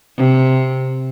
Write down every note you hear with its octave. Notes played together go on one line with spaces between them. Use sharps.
C3